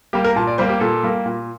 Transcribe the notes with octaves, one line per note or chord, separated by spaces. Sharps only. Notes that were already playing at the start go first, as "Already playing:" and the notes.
G3 A#3 G4
A#4
A#2 A5
D5
G3 A#3 C5
G4
A#2 A4
G3 A#3
A#2